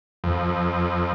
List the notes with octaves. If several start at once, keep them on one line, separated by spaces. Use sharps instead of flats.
F2